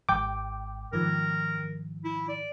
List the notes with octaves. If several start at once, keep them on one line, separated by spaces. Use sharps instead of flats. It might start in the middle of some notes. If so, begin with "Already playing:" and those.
G#1 G#2 G5 D6
G#2 D#3 F3 A#4
E4
D5